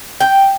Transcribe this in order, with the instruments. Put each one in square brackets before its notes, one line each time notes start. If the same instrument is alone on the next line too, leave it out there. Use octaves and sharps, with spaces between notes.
[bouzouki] G5